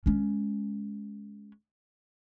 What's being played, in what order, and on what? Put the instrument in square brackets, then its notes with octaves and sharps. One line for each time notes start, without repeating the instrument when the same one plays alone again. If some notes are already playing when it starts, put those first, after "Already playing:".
[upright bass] G#3 C#4